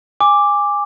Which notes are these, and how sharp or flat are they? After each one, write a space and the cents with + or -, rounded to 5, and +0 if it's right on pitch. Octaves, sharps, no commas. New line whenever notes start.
G#5 -20 D6 +0